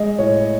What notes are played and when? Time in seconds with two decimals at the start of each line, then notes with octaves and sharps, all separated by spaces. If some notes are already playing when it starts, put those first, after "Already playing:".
Already playing: G#3 D#5
0.19 A2 C#5